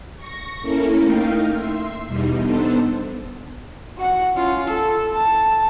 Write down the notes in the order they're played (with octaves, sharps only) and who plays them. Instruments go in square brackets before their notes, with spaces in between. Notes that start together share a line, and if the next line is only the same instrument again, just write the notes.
[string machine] C#6 A#6
A#3 C#4 E4 A4 A#4
A3 A#3 D#4 A#4 F5 G5
E5 C6
E2 B2 G3 D#4
B3 D4 D#4 A4 C5
[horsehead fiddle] F#4 F#5
C#4 F4
A4
A5